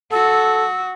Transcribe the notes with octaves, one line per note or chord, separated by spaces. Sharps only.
F#4 A4 E6